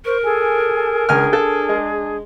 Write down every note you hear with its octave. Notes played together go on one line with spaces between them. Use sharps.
A#4 C5 C#6
G#4 A4 G#5
C#2 D4 G#4 G#5 F6
A4
G#3